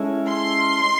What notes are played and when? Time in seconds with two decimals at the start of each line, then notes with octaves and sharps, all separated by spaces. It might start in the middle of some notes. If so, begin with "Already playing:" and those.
Already playing: G#3 C#4 E4 A4
0.28 C6